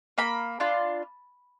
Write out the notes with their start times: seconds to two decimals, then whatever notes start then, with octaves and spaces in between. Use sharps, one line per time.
0.18 A#3 B5
0.60 D4 F4